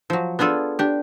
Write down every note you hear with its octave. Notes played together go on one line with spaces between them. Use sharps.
F3 F#3
B3 D4 F4 G#4 A4
D4 G4